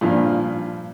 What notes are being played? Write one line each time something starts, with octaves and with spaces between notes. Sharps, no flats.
G2 A#2 F3